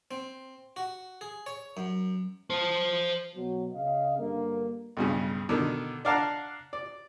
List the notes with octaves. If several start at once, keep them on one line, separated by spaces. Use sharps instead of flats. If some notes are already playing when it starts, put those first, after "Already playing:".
C4
F#4
G#4
C#5
F#2
C5 A5
B2 F#3
C#3 D#5 F5
G2 D3 A#3
B1 G2 C#3
B2 D3 D#3
D4 D5 F5 F#5 A5 A#5
D5